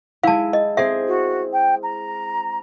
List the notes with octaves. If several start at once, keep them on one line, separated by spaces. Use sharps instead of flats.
G#3 E4 F5 A5
D#5
C4 G#4 C5 E5
F#4
G5
A#5